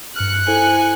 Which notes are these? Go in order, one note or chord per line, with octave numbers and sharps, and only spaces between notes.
G2 F6 F#6 C#7
E4 A4 C5 G#5